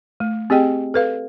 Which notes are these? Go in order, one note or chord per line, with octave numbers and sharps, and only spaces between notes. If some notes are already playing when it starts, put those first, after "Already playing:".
A3
C4 G4 G#4 D#5 G5
A4 B4 F5